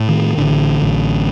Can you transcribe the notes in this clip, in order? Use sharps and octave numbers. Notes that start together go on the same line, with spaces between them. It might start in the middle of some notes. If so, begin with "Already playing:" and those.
Already playing: A2
D#3
A1 D3
A1